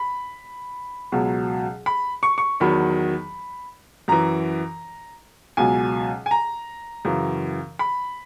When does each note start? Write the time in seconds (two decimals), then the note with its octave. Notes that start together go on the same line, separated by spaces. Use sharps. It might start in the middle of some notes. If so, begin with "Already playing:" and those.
Already playing: B5
1.12 C#2 B2 F#3
1.86 B5
2.23 C#6
2.38 C#6
2.60 E2 D#3 F#3 B5
4.08 F#2 E3 A#5
5.57 C#2 B2 F#3 G#5
6.26 G#5
6.31 A#5
7.05 F#2 C#3 E3
7.79 B5